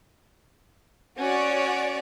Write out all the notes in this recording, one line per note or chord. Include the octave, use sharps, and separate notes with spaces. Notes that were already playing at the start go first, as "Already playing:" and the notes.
C#4 F#4 C#5 D5